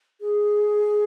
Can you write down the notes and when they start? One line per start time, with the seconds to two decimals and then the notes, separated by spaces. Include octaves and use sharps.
0.21 G#4